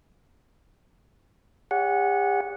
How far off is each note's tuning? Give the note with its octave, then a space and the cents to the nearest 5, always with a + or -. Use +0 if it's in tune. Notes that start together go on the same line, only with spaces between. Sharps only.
G4 +45 C#5 +40 F#5 -10